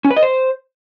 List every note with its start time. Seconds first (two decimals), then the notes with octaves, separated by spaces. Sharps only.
0.05 C#4
0.11 B4
0.16 D#5
0.22 C5